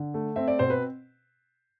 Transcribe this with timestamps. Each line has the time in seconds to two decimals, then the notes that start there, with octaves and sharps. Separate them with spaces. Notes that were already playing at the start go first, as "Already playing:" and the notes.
Already playing: D3
0.14 A3
0.36 C4 E5
0.48 D5
0.59 B2 C5
0.70 B4